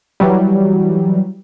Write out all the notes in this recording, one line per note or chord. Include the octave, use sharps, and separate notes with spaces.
E3 F#3 G3